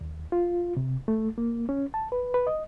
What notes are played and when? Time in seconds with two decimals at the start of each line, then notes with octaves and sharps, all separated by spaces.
0.01 D#2
0.32 F4
0.77 C3
1.08 A3
1.38 A#3
1.69 C#4
1.94 A5
2.12 B4
2.34 B4
2.47 D#5